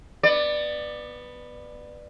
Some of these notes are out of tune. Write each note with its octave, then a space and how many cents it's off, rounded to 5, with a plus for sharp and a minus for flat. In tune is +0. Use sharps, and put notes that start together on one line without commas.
B3 +0 D5 +20